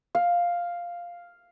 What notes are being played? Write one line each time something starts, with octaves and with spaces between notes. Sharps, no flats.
F5